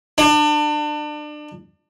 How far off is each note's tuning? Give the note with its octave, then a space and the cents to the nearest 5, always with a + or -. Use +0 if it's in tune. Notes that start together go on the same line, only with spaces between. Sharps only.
D4 +30